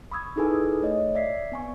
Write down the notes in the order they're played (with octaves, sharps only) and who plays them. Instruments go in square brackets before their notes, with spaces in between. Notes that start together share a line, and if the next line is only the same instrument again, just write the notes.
[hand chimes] B5 C#6 D#6 E6 G#6
D#4 E4 G#4 A4 B4 G#5
A3 C#5 D#5
D5 E5 B6 C7
B3 G#5 C#6